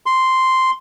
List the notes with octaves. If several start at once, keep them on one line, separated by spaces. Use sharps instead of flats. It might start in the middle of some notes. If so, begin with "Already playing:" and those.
C6